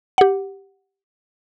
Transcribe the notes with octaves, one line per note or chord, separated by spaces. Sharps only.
G4 F#5